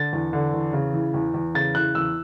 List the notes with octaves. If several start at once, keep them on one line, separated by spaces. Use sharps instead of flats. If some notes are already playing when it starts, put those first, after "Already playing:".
Already playing: D3 A6
E2
D3
E2
C#3
E3
E2
E2
C#3 A6
E3 F#6
E2 E6